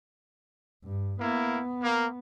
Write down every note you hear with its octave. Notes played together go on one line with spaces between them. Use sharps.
G2
A#3 B3 E4
A#3